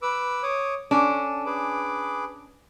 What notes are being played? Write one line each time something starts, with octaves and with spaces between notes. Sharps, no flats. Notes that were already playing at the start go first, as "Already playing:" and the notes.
B4 D6 E6
C#5 D6 D#6
C#4 D4 A4
G#4 B4 D6